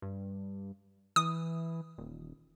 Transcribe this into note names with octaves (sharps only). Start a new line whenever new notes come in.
G2
E3 D#6
D#1